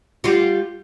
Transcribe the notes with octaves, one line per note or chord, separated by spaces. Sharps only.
G3 F4 F#4